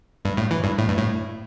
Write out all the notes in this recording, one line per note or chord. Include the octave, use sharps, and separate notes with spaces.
G2
A2
E3
G2
A2
G2
A2